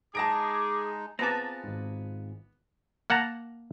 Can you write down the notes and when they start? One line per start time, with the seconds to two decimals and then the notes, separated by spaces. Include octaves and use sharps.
0.15 G#3 D#4 G#4 A5 D6 A#6 D7
1.19 B3 C4 F4 G#4 B4 A5 A#5 D6
1.64 G#1 G#2
3.10 A#3 F#5 A5 A#5